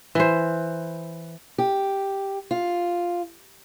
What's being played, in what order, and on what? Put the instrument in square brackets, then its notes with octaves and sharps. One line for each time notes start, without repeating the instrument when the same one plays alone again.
[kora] E3 C5
[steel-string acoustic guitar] G4
F4